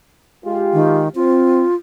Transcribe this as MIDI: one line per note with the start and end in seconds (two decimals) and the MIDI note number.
0.43 1.05 56
0.43 1.05 65
0.43 1.05 67
0.73 1.08 51
1.15 1.62 60
1.15 1.75 65